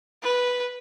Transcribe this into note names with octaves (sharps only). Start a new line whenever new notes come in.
B4